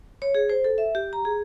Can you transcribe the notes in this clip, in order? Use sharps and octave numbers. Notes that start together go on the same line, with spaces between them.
C#5
G#4
C5
A4
E5
G4
A#5
G#4